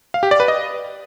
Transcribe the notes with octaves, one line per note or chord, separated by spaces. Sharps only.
F5
G4
D5
B4
D#5